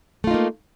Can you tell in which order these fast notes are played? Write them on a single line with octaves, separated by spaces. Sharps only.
A3 F4 D#4 A#3